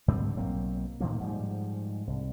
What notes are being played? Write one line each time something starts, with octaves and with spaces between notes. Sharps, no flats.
G#2 D3 G3 C4
B1 F#3 A#3 C4
A2 D#3 F3 A#3
G#2 F3 G3
C2